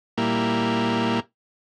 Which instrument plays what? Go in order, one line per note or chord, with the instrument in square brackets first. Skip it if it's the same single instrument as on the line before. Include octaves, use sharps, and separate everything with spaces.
[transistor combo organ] A#2 G3 A#3 E4